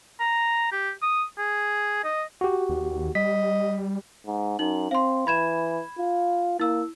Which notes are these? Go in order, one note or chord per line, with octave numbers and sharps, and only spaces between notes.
A#5
G4
D#6
G#4
D#5
F#4 G4
D#2
G3 D#5 B6
G#2
F#2 D#4 F#7
C4 F5 C6
E3 B5 G#6 E7
F4
A#3 E4 E6